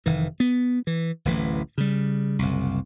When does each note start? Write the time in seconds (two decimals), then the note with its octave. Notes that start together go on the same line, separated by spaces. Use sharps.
0.06 F1 D#3 E3
0.40 B3
0.87 E3
1.25 D1 A1 E3
1.78 C#3 G3
2.39 F#1 C2